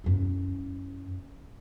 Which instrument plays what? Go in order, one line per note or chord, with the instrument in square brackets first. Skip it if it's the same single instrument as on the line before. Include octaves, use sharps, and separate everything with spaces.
[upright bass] F#2 E4